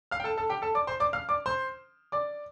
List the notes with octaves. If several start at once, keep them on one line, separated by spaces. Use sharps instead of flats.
F5 F6
G5
A4 A5
A4 A5
G4 G5
A4 A5
D5 D6
C5 C6
D5 D6
F5 F6
D5 D6
C5 C6
D5 D6